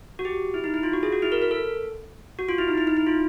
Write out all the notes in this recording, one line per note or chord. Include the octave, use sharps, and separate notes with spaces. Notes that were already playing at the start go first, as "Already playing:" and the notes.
F#4
G4
E4
D#4
E4
F4
F#4
G#4
F#4
E4
A#4
A#4
A4
F#4
F4
E4
D#4
E4
D#4
E4
F4